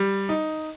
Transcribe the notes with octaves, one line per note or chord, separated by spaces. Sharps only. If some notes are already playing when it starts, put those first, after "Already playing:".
Already playing: G3
D#4